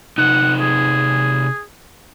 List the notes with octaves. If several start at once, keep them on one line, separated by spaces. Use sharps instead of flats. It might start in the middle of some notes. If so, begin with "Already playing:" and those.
C3 D#4 F#5
G#4